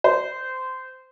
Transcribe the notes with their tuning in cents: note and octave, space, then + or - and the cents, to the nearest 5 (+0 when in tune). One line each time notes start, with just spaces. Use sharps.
C5 -20